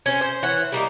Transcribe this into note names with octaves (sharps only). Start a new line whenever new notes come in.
C#4 C5
C5
E3 C#5 F#5
G3 A#3 D#4